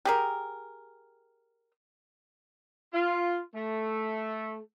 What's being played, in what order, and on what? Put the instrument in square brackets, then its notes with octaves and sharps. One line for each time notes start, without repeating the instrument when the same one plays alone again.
[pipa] G4 G#4 A#4
[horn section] F4
A3